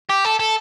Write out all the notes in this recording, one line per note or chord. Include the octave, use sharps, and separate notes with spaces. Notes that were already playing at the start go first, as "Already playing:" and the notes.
G4
A4
A4